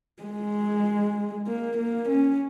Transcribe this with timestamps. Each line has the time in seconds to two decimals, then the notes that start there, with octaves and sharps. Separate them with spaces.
0.23 G#3
1.47 A#3
1.77 A#3
2.09 C#4